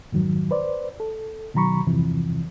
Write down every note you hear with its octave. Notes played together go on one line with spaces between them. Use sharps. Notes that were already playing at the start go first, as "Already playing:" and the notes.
F2 G#2 D#3 F#3
B4 C5 D5
A4
B2 D#3 F#3 A#5 B5 C#6
E2 G2 C3 E3 F3